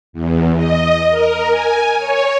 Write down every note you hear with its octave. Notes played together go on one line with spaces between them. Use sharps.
E2
D#5
A#4
G#5
C#5